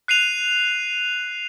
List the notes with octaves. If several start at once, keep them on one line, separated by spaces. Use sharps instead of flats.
F#6 C7 D#7 F7